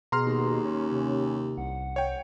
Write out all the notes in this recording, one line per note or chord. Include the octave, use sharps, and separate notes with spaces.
B2 G#4 A#5 C6 F6
D#2
C#4
C3
C2 F#5
C#5 G5